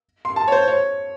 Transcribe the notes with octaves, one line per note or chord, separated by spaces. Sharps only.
C6
A5
C#5
C5
C#5